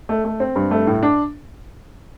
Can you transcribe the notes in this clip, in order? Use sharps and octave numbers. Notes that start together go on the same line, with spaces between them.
A3
A3
C4
G2
A3
A2
D4